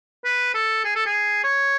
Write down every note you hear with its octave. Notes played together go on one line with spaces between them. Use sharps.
B4
A4
G#4
A4
G#4
C#5